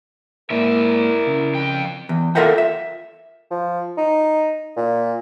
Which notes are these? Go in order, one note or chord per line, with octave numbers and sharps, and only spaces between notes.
G#2 A#3 E4 A#4 D5 E5
C#3
F2 G5
E2
F4 A4 A#4 E5 F#5 G5
E5
F3
D#4
A#2